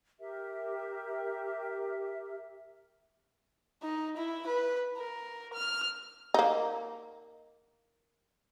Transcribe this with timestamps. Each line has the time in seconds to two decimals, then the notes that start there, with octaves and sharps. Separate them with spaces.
0.20 G4 A#4 E5
3.82 D#4
4.17 E4
4.46 B4
4.97 A#4
5.54 F6
6.34 A#3 D#4